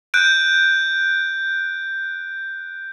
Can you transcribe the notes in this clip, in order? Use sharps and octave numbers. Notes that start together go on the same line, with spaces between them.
F#6 G6 D7